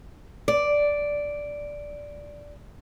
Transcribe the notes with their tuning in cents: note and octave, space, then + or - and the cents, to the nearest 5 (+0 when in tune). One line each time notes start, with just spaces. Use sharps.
D5 -5